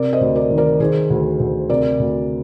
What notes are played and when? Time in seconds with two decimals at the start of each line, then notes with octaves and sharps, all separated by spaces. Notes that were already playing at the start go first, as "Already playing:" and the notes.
Already playing: C3 A#4 D5
0.13 C5 D#5
0.21 D2
0.35 A#4 D5
0.50 D#3
0.58 A#4 D5
0.80 D#3 G#4 C5
1.10 D2
1.40 D2
1.69 C3 A#4 D5
1.99 D2